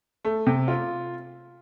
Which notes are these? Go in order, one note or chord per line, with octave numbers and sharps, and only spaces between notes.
A3
C3
F4